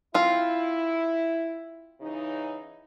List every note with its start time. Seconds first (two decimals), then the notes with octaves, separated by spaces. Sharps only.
0.14 C4 E4 F4
2.01 C#3 E3 D#4